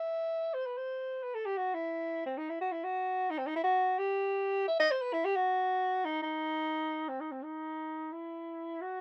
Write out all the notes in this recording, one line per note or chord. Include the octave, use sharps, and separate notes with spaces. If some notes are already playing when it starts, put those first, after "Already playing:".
Already playing: E5
C5
B4
C5
B4
A4
G4
F#4
E4
C4
D#4
E4
F#4
E4
F#4
D#4
C4
D#4
E4
F#4
G4
E5
D#5
C5
B4
E4
G4
F#4
D#4
D#4
C4
D#4
C4
D#4
E4
F#4